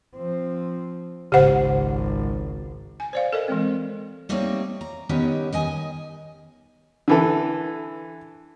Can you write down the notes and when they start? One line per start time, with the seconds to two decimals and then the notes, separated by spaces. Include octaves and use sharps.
0.15 F3 C4
1.32 G#1 C#2 C#3 G4 C5 F#5
3.00 G#5
3.13 C5 D5 F5
3.33 A4 A#4 D#5
3.48 E3 G#3 C4
4.29 G3 A3 A#3 C4 D#4 C#5
4.81 A#5
5.09 D#3 B3 C#4 D#4 G4 C#5
5.53 D#3 D#5 G#5
7.08 D3 E3 A4